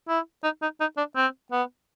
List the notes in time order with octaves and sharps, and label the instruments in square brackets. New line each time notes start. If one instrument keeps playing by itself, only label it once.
[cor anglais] E4
D#4
D#4
D#4
D4
C4
B3